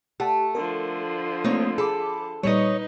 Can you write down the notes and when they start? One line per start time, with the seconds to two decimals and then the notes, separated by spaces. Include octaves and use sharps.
0.20 A3 G4 F#5 A5
0.55 D3 F3 A#4
1.44 A3 A#3 C4 D#4 C#5
1.78 G#4 A4 B5 D6
2.43 A#2 G3 D#4 B4 C#5 D#5